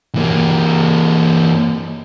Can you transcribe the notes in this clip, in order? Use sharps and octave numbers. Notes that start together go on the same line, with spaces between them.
E3 A#3